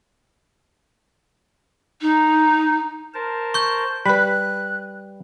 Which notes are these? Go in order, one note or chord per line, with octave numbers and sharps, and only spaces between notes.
D#4
A#4 C5 A5
C#6 G6
G3 B4 B5 F#6